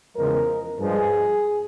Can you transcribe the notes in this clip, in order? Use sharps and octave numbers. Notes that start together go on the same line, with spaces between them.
E2 C#3 F3 G#3 A#4
G2 F3 G#3 G#4